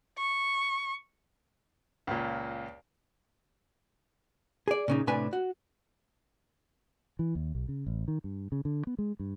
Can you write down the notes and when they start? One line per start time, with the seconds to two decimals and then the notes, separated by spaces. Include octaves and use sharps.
0.18 C#6
2.07 C#2 A#2
4.68 G#4 D5
4.88 A#2 C#3 D#4
5.07 A2 C3 D4 B4 G#5
5.33 F#4
7.19 E3
7.35 D#2
7.55 B1
7.68 C#3
7.87 A1
8.08 D#3
8.24 G2
8.52 C#3
8.65 D3
8.87 B3
8.99 G#3
9.20 G2